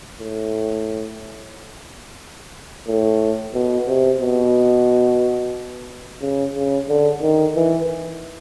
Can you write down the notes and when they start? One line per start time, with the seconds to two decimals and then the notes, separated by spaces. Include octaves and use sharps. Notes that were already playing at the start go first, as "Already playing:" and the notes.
0.19 A2
2.87 A2
3.54 B2
3.87 C3
4.21 B2
6.22 C#3
6.55 C#3
6.89 D3
7.22 D#3
7.55 E3